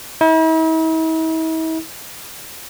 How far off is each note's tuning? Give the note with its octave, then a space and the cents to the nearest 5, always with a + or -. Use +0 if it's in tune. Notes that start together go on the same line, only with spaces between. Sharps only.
E4 -45